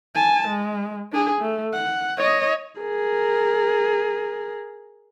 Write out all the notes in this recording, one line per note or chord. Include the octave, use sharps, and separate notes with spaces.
G#5 A5
G#3
D4 G#4
A3
F#5
C#5 D#5
G#4 A#4